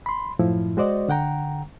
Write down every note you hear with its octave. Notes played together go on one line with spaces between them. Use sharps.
B5 C6
F#2 A2 F3 E4
G#3 F#4 C5 D5 D#5
D3 F#5 G5 A#5